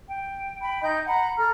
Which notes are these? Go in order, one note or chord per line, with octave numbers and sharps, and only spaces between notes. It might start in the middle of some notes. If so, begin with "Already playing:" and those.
G5
G5 B5
D#4 D#5 G5 G6
F#5 A#5 B5
A4 A#5 F6